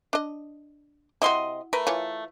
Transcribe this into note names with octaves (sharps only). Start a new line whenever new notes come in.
D4 D#5
C3 E4 F#4 D#5 C6
A3 A#4 B4
E3 F4 C#5